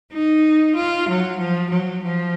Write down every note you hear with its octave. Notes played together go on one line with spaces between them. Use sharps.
D#4
F4
F#3
F3
F#3
F3